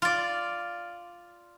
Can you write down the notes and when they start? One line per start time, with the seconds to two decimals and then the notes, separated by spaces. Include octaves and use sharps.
0.02 F4 D5